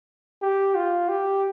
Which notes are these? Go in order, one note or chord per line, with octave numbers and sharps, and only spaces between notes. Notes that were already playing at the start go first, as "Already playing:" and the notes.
G4
F4
G4